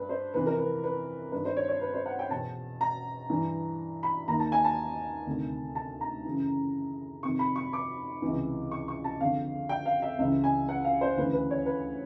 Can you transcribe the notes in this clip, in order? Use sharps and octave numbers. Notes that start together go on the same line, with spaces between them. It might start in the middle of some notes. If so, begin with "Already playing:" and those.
Already playing: G2 B4
C5
F2 C3 E3 B4
A#4
B4
B4
G2 D#3 B4
C5
C#5
C#5
B4
C5
F#5
G5
E2 B2 A5
A#5
G2 E3
B5
D#2 D#3 A#5
A5
G#5
A5
D2 C3 D#3
A5
A#5
F#2 C#3 E3
F2 C3 D#3 C#6
B5
C#6
D6
C#2 C3 E3
C#6
C#6
A5
F2 D3 F5
G5
F5
E5
C#2 C#3 E3 E5
G#5
F#5
F5
C5
D2 C#3 E3 B4
B4
C#5
B4